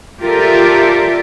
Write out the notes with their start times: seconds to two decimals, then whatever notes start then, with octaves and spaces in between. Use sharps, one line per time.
0.21 F4 G4 A4 A#4 D5 E5